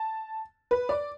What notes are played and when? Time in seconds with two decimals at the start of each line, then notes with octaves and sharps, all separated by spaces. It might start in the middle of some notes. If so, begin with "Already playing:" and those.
Already playing: A5
0.71 B4
0.89 D5